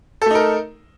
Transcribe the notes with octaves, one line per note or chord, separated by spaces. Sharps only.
A3 D#4 A4 A#4